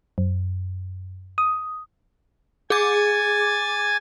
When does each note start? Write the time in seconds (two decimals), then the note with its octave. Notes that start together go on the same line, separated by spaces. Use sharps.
0.18 F#2
1.38 D#6
2.70 G#4 G#5 D6 G#6 A6